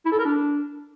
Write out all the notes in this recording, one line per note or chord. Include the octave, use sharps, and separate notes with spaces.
E4
A4
A#4
D4